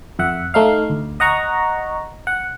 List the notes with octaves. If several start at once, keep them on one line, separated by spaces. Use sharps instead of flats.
F2 E5 F#5
A3 D#4 F5
D2
D#5 F#5 A#5 C#6
F#5